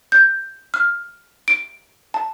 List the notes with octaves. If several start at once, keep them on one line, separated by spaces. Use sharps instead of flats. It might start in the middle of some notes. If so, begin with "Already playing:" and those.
G6
F6
D7
A5